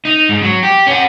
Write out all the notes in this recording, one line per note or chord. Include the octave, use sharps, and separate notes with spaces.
D#4
G#2
F#3
G4
C#4 F#5